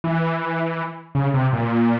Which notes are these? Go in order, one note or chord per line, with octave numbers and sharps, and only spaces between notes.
E3
C#3
C3
A#2